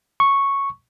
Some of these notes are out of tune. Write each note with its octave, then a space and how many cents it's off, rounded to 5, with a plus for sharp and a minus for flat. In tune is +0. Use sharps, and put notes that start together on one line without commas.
C#6 -5